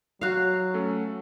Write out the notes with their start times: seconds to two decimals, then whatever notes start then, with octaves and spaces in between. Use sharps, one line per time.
0.21 F#3 F#4 F5
0.74 A3 C#4 A4